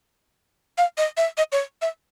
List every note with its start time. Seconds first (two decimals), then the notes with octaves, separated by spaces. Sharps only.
0.78 F5
0.98 D#5
1.17 E5
1.38 D#5
1.52 C#5
1.82 E5